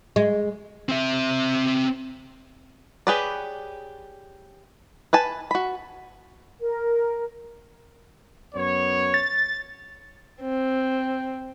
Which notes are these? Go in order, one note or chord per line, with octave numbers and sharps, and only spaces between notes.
G#3
C4 E5
G4 G#4 B4 C#5 D5
B4 G#5 A5
F#4 B5
A#4
F#2 B3 C#5
A6
C4